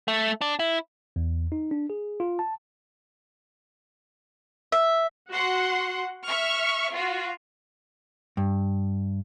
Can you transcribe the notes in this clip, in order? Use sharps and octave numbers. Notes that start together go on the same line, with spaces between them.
A3
D4
E4
E2
D#4
D4
G#4
F4
A5
E5
F#4 F#5 C6
E5 C#6 F6
F4 F#4
G2